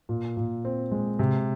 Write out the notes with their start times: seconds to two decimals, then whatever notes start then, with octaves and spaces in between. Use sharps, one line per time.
0.09 A#2
0.37 A#2
0.65 C4
0.92 G#3
1.19 C3